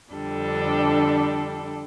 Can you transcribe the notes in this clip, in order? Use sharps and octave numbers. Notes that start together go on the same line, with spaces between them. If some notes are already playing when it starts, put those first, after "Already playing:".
F2 D3 G3 D4 A4